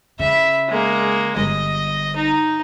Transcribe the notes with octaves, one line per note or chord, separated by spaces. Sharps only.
C#3 E5 B5
G#3 A#3
G1 D#5
D#4